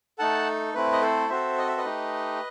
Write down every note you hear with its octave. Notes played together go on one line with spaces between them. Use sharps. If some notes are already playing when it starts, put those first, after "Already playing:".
A3 D#4 A4 F#5 A5
A3 C4 E4 B4
D#5
A4 C5
C4 F#4 A4 C5 E5
D#5
E5
B4 D#5
A3 D#4 G4